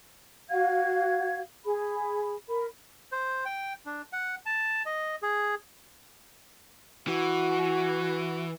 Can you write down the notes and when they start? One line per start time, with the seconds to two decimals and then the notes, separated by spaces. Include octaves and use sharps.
0.50 F#4 F5 F#5 G#6
1.65 G#4 B5
2.48 A#4 B5
3.12 C5
3.45 G5
3.86 D4
4.13 F#5
4.46 A5
4.86 D#5
5.22 G#4
7.07 E3 F#4